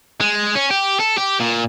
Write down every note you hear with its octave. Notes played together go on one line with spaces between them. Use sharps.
G#3
C#4
G4
A4
G4
A#2